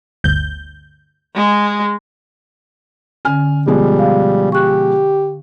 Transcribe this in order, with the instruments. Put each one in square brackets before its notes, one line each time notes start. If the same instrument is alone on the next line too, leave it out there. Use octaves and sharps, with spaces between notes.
[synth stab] G1 D2 G6
[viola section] G#3
[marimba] D3 C#4 [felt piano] G#5 F6
[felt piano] B2 F3 G#3 [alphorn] G3
[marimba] F5
[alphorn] G4 [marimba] C#6 F#6